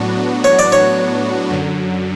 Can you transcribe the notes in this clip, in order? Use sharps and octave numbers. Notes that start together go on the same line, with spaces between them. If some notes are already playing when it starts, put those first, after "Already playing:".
Already playing: A2 F#3 B3 D4 F#4
C#5
D5
C#5
F#2 D3 F#3